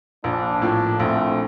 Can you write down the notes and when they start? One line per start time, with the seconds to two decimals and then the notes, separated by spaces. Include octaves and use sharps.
0.23 A#1 A#3 D4
0.62 A2 F3
1.00 A#1 A3 C4